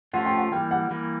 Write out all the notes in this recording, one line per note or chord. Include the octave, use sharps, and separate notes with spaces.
F3 A3 C#4 F4 F#5
G5
F#5
E3 G3 A#3 G5
F#5
E3 G3 A#3